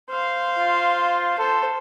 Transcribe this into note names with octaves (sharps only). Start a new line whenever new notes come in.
C5 F5
F4
A4 C5